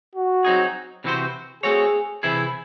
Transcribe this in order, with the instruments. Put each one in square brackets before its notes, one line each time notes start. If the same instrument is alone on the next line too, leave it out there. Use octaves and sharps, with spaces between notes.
[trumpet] F#4
[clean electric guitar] F#3 C4 D#4 G#4
C3 E3 C4 F#4 C5
[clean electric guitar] A3 C4 F#4 C#5 [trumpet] G#4
[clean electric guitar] C3 E3 C4 E4 G#4